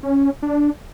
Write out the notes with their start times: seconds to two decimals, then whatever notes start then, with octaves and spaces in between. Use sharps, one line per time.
0.03 C#4
0.43 D4